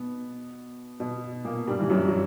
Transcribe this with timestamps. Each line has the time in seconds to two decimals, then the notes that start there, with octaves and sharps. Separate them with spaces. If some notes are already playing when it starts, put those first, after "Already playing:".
Already playing: B2 B3
1.00 B2 B3
1.44 A#2 A#3
1.67 G2 G3
1.80 E3
1.90 F#2 F#3
2.08 F#3